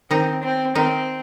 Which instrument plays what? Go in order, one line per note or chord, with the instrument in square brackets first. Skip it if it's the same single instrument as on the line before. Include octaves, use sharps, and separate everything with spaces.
[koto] D#3 D#4 [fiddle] C4
[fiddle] C4
[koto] D#3 D#4 [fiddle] C4